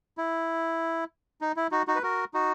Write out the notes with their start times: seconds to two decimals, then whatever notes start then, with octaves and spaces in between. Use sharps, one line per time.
0.18 E4
1.41 D#4
1.57 E4
1.71 D#4 F#4
1.87 D#4 F#4
1.95 B4
2.03 F#4 A#4
2.34 D#4 F#4